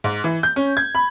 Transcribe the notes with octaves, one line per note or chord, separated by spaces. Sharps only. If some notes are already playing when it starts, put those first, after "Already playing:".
G#2
E3
G6
C#4
G#6
B5